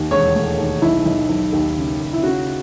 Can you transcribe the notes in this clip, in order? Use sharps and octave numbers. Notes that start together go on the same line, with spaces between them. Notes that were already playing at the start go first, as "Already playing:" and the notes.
Already playing: D#2
E1 C#5
A3
D#2
B1 E4
B1
B1
D#2
C#3
D#2
E4
C#3 F#4